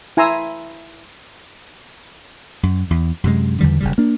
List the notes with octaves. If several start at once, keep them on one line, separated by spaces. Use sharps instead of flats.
E4 G#5 A#5 C6 E6
F#2
E2
F#2 C3 G#3
E2 D3 D#3 G3
F#1 C#3 G3
A#3 D4